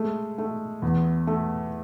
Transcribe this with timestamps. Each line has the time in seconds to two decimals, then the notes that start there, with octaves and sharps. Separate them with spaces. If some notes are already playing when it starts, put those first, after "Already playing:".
Already playing: G#3 A3
0.38 A3
0.82 E2
1.27 A3